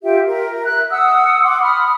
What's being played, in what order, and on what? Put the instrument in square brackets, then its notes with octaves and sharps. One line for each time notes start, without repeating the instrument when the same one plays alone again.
[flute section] F4 G4 E5 G5
A#4
E5 F#6
F#5 D#6 E6
F#5 C6 D6
B5 D#6 F6